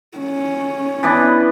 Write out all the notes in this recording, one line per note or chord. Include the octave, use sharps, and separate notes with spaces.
C#4
E3 B3 D4